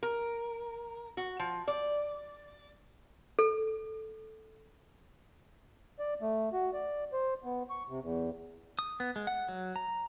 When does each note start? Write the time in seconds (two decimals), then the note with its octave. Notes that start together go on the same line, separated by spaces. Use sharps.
0.03 A#4
1.17 F#4
1.40 F3
1.68 D5
3.39 A4
5.99 D5
6.21 A3
6.53 F#4
6.73 D5
7.13 C5
7.44 B3
7.70 C#6
7.89 C3
8.02 E2
8.79 D#6
9.00 B3
9.16 G#3
9.27 F#5
9.48 F#3
9.76 A#5